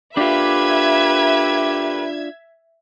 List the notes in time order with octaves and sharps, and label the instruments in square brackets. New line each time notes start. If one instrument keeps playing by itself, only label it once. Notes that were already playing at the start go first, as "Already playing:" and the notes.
[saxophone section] D3 A#3 G4 [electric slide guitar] D4 F4 [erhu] B4 [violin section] E5 G#6